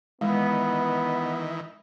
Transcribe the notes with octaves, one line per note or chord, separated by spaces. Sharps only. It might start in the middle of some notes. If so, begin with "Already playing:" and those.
D#3 E3 G#3 B3